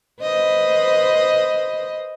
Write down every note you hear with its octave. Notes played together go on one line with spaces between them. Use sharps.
B4 C5 D#5